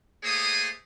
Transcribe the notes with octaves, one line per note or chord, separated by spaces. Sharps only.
A3 A#3 G#4 C5 C#5 D#6